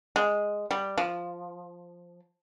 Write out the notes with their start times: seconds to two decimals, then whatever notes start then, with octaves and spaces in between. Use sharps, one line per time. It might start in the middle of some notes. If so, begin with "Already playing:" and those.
0.16 G#3
0.71 G3
0.98 F3